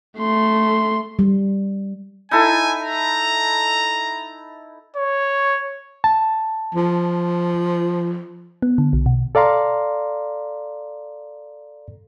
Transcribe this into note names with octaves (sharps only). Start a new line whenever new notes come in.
A3 C6
G3
D#4 E4 A4 G#5
A#5
C#5
A5
F3
B3
D3
B1
B2
A4 D5 F5 A#5 C6